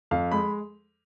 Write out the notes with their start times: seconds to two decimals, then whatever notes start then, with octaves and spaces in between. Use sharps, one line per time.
0.11 F2 F5
0.32 G#3 B5